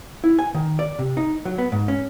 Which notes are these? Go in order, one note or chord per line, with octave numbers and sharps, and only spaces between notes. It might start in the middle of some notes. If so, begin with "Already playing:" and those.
E4
G#5
D#3
D5
C3
D#4
F#3
B3
G#2
C#4